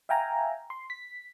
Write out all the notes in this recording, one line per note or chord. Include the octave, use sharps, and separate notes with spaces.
E5 F5 G5 G#5 A#5
C6
B6